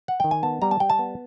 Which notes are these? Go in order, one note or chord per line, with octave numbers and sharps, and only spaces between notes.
F#5
D#3 G5
G#5
B3 A5
G3 A#5
A5
G3 G5
A5
B3